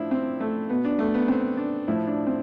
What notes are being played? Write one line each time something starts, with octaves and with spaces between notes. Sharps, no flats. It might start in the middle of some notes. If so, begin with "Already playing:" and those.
Already playing: A2 F3 D4 E4
C4
A3
B2 B3
D4
A3
B3
C4
D4
A2 F3 E4
D4
C4